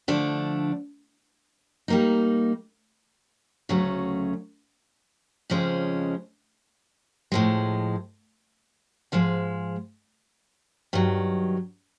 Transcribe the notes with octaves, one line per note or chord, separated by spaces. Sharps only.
D3 F3 A3 D4
G3 A#3 D#4
D2 C#3 F#3 A3 C#4
F2 C#3 F3 G#3 C#4
A2 F3 G#3
G#2 F3 G#3
G2 D#3 F#3